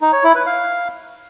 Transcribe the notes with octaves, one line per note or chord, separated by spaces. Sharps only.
D#4
C#5
E4
B4
F5